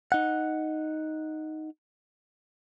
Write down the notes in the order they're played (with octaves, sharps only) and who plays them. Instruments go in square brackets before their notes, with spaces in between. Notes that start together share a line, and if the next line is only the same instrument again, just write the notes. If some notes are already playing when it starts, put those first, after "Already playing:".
[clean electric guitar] D#4 F#5